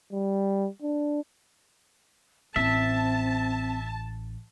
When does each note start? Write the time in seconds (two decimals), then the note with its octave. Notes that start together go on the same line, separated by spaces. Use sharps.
0.12 G3
0.82 D4
2.56 A1 C4 E5 A5